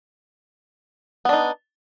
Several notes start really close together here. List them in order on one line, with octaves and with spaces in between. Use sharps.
B3 D4 D#4